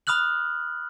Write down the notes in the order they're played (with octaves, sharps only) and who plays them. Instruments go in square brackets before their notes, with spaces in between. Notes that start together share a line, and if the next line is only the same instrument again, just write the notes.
[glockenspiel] B5 D#6 F6 F#6 F#7